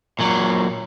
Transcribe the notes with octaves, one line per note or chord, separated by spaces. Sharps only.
A#2 F#3